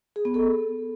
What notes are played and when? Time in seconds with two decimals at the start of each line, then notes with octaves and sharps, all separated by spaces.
0.16 G#4
0.25 B3
0.34 A4